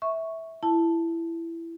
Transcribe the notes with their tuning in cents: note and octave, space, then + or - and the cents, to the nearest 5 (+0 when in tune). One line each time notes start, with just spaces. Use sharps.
E5 -15 C#6 +0
E4 +15 A5 +0